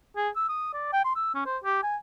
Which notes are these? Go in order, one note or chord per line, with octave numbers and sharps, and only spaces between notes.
G#4
E6
D#6
D5
G5
C6
E6
C#4
C5
G4
G#5